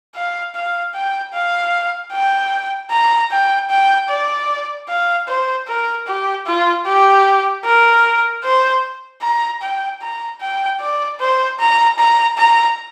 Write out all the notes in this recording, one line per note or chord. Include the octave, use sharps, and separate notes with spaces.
F5
F5
G5
F5
G5
A#5
G5
G5
D5
F5
C5
A#4
G4
F4
G4
A#4
C5
A#5
G5
A#5
G5
D5
C5
A#5
A#5
A#5